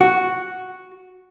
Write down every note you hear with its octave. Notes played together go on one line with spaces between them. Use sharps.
F#4